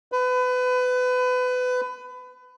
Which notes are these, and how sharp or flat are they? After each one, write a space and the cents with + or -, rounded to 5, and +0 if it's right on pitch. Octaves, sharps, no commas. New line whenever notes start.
B4 +25